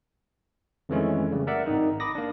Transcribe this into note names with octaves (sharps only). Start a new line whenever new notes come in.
F2 D#3 E3 G#3 A3 C#4
C#3 G3
A#4 D5 E5 F#5
G#1 D#3 D#4
B5 D6 D#6 A#6
A#3 D4